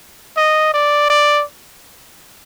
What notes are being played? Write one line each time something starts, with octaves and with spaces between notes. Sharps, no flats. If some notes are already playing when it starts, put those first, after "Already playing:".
D#5
D5
D5